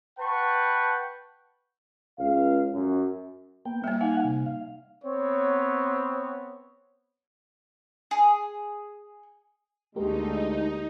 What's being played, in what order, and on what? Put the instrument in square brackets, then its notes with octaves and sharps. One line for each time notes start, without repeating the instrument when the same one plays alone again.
[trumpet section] B4 F#5 G5 A5 C#6
[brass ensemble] C#2 F5
F#2
[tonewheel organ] A#3 B3 G5
[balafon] G3 A#3 [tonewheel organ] E5
[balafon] D#4 [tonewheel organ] F5 F#5 G#5
[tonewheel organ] C3
F5
[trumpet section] B3 C4 C#5
[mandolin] G#4
[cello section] D2 [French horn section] G#3 [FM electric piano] A#3 G4 A#4 [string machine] D#4